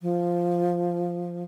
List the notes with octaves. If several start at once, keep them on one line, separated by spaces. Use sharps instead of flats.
F3